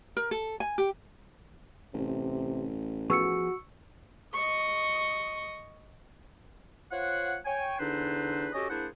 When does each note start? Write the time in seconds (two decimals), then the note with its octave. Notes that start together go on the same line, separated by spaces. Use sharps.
0.17 A#4
0.31 A4
0.60 G#5
0.78 G4
1.94 A1 C3
3.10 F3 B3 F#4 G#4 C#6 E6 C#7
4.34 D#5 C#6
6.91 F4 C5 C#5 F#5
7.45 C#5 G5 G#5
7.79 E2 D3 D4 D#4 B4 C5
8.54 C#4 F#4 G4 A4 C#5 D#5
8.70 A#3 D4 E4 G#4 C5 F#5